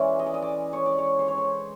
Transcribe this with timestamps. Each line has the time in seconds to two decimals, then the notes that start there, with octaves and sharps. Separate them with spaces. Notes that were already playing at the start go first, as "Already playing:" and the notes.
Already playing: E3 G#3 C#4 D5
0.19 D#5
0.26 D5
0.34 D#5
0.42 D5
0.73 C#5
0.86 D5
0.98 C#5
1.19 C5
1.28 C#5
1.38 C5